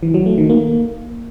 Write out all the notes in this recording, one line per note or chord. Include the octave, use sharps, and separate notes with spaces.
E3
F#3
A3
D#3
A#3